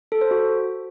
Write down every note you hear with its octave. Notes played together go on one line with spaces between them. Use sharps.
A4
C5
F#4